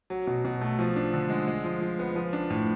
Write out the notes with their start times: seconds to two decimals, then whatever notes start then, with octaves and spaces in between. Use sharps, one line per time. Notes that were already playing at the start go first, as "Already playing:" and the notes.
0.10 F#3
0.27 B2
0.45 B2
0.61 A3
0.79 F3
0.96 D4
1.14 D3
1.30 G#3
1.48 G#3
1.65 F3
1.81 F3
1.99 B3
2.16 F3
2.33 D4
2.50 A2